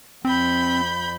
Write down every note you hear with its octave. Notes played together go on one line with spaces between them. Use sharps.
F2 C4 B5 G6